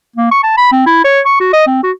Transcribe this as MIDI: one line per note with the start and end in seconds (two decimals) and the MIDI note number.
0.16 0.31 58
0.31 0.40 85
0.43 0.53 81
0.58 0.68 83
0.72 0.83 60
0.87 1.00 64
1.05 1.20 73
1.26 1.40 85
1.40 1.52 66
1.53 1.67 75
1.67 1.83 60
1.83 1.92 66